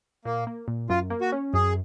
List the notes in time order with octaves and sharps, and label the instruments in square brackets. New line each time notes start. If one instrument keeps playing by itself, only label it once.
[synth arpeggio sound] A#2 [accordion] A#3
[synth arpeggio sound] A#3
A#2
[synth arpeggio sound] F#2 [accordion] F4
[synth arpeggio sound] A#3
[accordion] F#4
[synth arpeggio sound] C#4
[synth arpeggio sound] F#2 [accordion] G#4